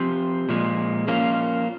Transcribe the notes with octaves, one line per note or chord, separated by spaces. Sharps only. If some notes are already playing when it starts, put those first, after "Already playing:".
Already playing: F3 C4 G4
A#2 F3 G#3
F3 A#3 C#4 F4